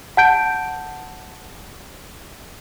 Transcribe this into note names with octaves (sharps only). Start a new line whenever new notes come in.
F#5 A5 G6 D7